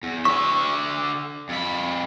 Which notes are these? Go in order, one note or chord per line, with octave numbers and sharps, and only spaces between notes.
E2
D3 E5 C#6
F2 B5